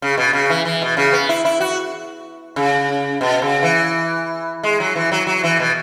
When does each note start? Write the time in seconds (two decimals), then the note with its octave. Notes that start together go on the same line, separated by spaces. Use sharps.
0.02 C#3
0.17 B2
0.33 C#3
0.50 E3
0.65 E3
0.82 B2
0.97 C#3
1.13 B3
1.29 E4
1.45 E4
1.60 F#4
2.56 C#3
3.21 B2
3.42 C#3
3.63 E3
4.63 G#3
4.80 F#3
4.95 E3
5.12 F#3
5.27 F#3
5.44 E3
5.60 B2